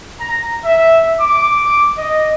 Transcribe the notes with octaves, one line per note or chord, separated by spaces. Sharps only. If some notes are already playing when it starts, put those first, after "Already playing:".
A#5
E5
D6
D#5